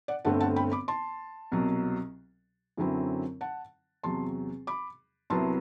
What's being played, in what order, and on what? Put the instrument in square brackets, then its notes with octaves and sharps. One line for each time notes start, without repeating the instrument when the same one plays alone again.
[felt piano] D5 F#5
G1 G2 D3 A3 C4 F#5 A5
F#5 A5
G5 B5
B5 D6
A5 C6
C2 B2 F#3
F#2 D3 F#3 C4 E4
F#5 A5
E2 C3 F#3 A5 C6
B5 D6
C2 C3 F#3 B3 E4 A5 C6